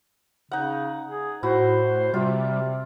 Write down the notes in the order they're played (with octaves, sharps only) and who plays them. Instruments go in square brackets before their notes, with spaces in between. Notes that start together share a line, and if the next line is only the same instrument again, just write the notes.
[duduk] C#3 [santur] D#4 F#5
[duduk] G#4
[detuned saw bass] A2 [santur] E4 F#4 [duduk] C5
[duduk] C3 [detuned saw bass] G3 [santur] F4